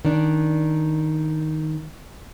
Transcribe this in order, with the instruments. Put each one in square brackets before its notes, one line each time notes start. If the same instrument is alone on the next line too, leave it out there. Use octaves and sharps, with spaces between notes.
[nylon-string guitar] D#3 D4